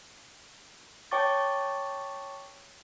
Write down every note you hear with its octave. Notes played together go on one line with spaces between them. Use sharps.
C#5 G5 A5 C#6 D6 A6